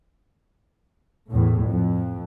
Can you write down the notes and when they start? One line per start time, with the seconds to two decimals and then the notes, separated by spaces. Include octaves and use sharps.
1.30 E2 A2
1.64 F2